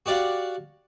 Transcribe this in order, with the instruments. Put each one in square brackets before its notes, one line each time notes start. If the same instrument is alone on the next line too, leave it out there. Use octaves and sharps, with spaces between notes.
[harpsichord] F#4 G4 D5 F5 F#5